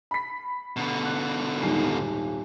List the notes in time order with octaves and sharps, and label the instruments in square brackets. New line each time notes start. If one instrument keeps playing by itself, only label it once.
[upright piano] B5 B6
[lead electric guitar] B2 D3
[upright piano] F#6
D#1 G#1 C7